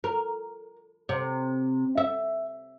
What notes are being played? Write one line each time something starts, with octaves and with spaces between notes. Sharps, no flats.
A#4
C3
E5